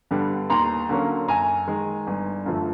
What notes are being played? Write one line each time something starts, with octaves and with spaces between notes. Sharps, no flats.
G2 D3 G3 B3
D#2 A#5 C6
D3 F#3 A#3 C#4
F#2 G#5 A#5
D#3 G#3
G1
F#2 D3 F3 A3